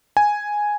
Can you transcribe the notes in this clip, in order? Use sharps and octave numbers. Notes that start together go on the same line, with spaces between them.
G#5